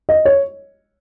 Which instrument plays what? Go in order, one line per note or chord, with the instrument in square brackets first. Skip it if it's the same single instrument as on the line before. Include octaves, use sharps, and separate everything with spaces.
[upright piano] D#5
C#5